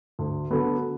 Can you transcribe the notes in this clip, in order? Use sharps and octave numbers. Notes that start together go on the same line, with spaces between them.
D2
D3 F#3 B3